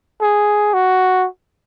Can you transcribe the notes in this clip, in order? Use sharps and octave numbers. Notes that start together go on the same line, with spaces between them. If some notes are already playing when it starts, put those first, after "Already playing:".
G#4
F#4